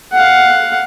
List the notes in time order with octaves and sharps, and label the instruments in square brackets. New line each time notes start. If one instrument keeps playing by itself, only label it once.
[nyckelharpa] F5 F#5